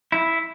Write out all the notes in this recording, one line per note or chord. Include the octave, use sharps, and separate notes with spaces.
E4